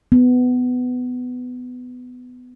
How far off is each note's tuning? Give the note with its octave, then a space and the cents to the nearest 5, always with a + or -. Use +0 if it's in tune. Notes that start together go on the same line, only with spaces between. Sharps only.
B3 +15